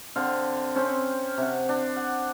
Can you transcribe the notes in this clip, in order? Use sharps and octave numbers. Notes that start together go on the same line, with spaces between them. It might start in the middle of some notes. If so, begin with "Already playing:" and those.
D3 C4 F5
C4 C#4 C5
C3 F#5
D4
F#5